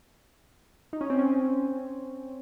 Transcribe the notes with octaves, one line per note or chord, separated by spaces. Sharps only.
D#4
C#4
C4
C#4